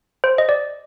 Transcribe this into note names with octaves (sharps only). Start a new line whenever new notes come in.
C5
D#5
D5